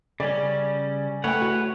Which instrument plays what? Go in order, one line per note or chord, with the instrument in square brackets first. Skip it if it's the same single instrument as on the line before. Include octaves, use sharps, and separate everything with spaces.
[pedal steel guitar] C#3 G3 C#4 [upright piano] D5
[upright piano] A3 G5 [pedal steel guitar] B4 C#5 F#5
[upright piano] F#4